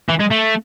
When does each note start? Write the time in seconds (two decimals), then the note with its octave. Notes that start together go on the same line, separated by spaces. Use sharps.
0.09 E3
0.20 G#3
0.31 A3